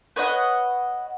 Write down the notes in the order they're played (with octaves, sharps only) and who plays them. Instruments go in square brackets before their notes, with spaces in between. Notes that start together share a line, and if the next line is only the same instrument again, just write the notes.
[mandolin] B4 C#5 D#5 F#5